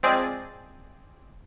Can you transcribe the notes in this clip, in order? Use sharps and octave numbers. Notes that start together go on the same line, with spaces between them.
F3 G#3 C4 G#4 D5